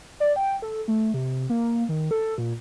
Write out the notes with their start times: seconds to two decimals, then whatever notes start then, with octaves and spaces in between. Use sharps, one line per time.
0.20 D5
0.36 G5
0.62 A4
0.88 A3
1.14 C3
1.50 A#3
1.89 D#3
2.11 A4
2.38 A#2